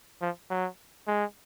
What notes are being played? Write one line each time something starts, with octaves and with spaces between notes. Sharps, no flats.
F3
F#3
G#3